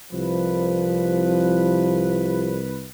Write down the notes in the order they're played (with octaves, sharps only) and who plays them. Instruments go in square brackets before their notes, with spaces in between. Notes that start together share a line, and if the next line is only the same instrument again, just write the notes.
[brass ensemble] C2 B4 [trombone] F3